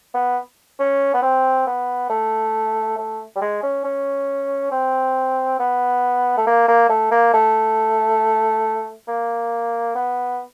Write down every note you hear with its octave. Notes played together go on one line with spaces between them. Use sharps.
B3
C#4
B3
C4
B3
A3
A3
G3
G#3
C#4
C#4
C4
B3
A3
A#3
A#3
A3
A#3
A3
A#3
B3